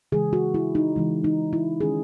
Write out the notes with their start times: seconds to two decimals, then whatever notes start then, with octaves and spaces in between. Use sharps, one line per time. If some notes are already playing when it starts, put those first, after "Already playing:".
0.12 C#3 E3 G#3 G#4
0.33 F#4
0.54 E4
0.75 D#4
0.96 C#3 E3 G#3
1.24 D#4
1.53 E4
1.81 D#3 G#3 C#4 G#4